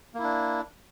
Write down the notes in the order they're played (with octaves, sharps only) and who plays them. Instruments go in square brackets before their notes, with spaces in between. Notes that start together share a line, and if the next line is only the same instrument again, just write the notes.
[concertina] A#3
E4
D4